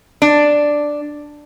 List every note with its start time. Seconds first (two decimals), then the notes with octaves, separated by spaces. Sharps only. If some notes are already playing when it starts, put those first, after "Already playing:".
0.22 D4